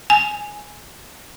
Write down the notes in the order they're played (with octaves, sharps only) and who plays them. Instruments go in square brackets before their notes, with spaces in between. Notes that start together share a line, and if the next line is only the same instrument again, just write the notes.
[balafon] G#5